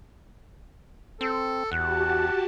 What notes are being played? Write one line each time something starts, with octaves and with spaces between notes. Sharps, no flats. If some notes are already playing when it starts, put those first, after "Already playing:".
C4 A4
E2 F#4 G4 F#5 A5